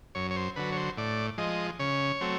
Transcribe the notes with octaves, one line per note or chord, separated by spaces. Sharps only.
F#2 C#5
C#5
C5
D3 F#3 B4
C#5
C5
A2 D5
F3 G#3 D#5
C#3 C#5
F#3 A3 C4